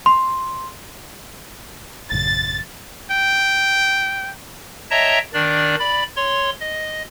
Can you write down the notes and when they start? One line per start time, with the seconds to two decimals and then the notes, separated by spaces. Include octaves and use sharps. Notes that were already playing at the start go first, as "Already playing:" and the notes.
0.06 C6
2.12 A1 F#2 C#3 A6
3.11 G5
4.91 C#5 D#5 E5 G5 A5 A#5
5.34 D#3 D4 D5
5.79 D5 B5
6.16 C#5 C6
6.60 D#5